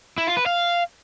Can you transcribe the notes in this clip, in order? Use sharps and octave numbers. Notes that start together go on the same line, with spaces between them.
E4
F4
B4
F5